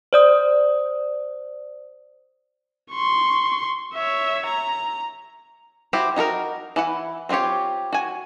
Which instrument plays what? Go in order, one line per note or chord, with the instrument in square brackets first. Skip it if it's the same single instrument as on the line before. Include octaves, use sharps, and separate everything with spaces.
[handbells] C5 D5 D#6
[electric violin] C6 C#6
C#5 E5
A#5
[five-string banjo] E4 F#4 G4 C5
D#4 F#4 A4 A#4
E3 E4 F#5
C4 D4 F4 G4 C#5
F#4 G#5